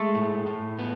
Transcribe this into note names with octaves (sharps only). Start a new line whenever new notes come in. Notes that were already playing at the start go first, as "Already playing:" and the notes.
Already playing: G#3 A3
A2
A2
B3